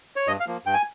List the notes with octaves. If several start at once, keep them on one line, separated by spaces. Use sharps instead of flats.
C#5
G2 D#5
F5
F3 A#3
G2 G5
G#5